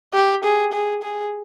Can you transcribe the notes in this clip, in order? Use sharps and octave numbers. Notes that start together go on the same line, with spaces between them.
G4
G#4
G#4
G#4